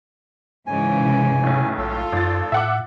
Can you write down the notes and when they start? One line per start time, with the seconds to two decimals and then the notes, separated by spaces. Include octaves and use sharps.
0.67 G#2 C#3 E3 G#5
1.00 C3
1.43 B1 A2
1.78 A#1 F4 A4
2.12 G#1 F#2 A6
2.52 A2 E5 F#5 D6